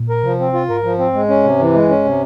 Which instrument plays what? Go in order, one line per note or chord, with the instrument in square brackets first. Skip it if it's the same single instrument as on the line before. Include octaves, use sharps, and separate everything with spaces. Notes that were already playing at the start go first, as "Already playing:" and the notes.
Already playing: [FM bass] A#2
[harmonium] A#4
[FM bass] C3 [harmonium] F3
[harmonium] C4
F4
[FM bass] G#2 [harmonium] A#4
[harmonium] F3
C4
G#3
C#4
C3
[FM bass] G2 [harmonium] E3
[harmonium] G#3
C#4
C3